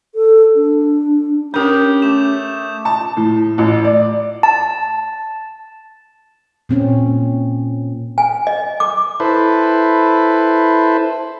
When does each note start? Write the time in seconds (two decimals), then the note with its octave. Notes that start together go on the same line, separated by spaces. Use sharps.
0.15 A4
0.56 D4
1.54 C#4 D4 G4 A#4 D#6 G6
2.02 A3 D6 E7
2.85 A5
3.17 A2
3.58 A1
3.85 D5
4.43 A5
6.69 A#2 C4 C#4
8.18 G#5
8.47 D#5
8.80 D6
9.20 E4 A4 B4 C5